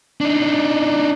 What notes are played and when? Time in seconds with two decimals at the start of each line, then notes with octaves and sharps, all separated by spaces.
0.21 D4 D#4